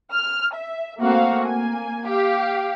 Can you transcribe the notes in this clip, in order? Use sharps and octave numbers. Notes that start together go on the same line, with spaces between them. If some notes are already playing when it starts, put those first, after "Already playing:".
F6
E5
A3 A#3 C4 F#4 F5
A#3 G#5
G4 F5